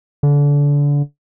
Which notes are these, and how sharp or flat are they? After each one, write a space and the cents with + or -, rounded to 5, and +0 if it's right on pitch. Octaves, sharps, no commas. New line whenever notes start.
D3 -30